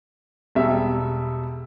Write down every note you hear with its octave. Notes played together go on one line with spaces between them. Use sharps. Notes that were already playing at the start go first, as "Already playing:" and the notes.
E1 B2 G3 E5